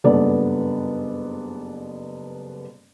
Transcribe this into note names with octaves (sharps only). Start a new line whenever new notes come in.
F#1 G2 B3 A4 D5